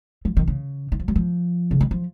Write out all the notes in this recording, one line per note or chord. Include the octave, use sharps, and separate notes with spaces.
F3
D#3
C#3
D#3
F3
F#3
F3
C#3
D#3
F3